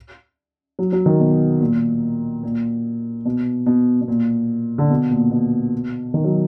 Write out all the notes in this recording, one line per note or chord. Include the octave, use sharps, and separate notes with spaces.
F#3
F#3
D#3
B2
A#2
A#2
B2
B2
B2
A#2
D3
B2
A#2
B2
D#3
F#3